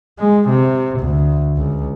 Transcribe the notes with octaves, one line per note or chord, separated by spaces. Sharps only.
G#3
C3
D2
C#2